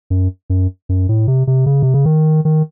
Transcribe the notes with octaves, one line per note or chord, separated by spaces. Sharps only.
F#2
F#2
F#2
A2
C3
C3
C#3
C3
C#3
D#3
D#3